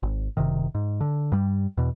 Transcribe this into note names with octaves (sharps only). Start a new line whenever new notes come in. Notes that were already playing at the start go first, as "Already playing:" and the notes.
G#1
F#1 C3 D#3
G#2
D3
G2 G3
E2 B2